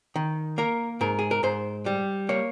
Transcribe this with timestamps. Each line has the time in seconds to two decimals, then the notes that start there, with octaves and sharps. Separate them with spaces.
0.16 D#3
0.58 A#3 A#4
1.01 G#2 A#4
1.19 G#4
1.31 A#4
1.43 G#2 C5
1.86 G3
2.29 A#3 C#5